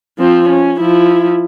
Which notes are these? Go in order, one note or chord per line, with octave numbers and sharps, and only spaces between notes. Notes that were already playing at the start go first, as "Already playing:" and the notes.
F3 C4
C#4
F3 E4